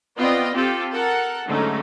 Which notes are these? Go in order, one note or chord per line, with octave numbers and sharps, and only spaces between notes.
B3 C4 F4 D5 D#5 G5
C4 F4 G4 A4
A4 A#4 F#5
G#2 D3 F#3 A3 C#4 D#4